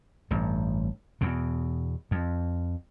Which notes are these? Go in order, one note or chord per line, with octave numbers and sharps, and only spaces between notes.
A1 G2
E2 B2
F2